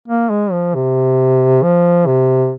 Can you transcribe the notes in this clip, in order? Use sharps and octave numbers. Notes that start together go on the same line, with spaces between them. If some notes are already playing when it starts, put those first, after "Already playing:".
A#3
G#3
F3
C3
F3
C3